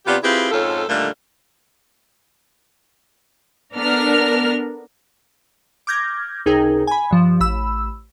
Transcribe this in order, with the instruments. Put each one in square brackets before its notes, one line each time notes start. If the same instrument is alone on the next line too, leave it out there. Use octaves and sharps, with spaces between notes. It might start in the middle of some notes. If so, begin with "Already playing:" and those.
[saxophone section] C3 B3 D4 F4 G4
C4 E4 F4 G4 G#4 B4
F2 G#2 C#4 F4 A4
A#2 D3 D#3 G3 A3 A#3
[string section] B3 D4 A4 A#4 F6
[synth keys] D6 F6 G6 G#6 A#6
C#2 C3 D#4 G#4 A#4 G5
G#5 B5
G2 F3
A1 B5 E6